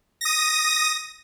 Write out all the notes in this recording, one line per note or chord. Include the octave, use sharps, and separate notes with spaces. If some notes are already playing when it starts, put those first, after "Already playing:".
D#6 A#6